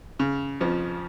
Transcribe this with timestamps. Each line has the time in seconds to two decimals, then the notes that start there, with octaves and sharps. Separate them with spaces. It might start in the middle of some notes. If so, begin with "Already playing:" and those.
0.19 C#3
0.61 F2 F3